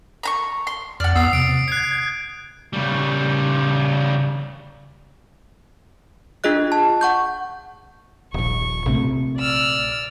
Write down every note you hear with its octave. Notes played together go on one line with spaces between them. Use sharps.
A#5 B5 C#6
C6
F2 D5 F#5 F6
E2 B3 D#6 E6 C7
C3 D7
F#6 G#6 C7
C#3 G3
D4 F4 G#4 D#5 F#6
A5
F#5 C#6 G6
D#1 A#1 C#6
A#1 C3 A3
D5 E6 F6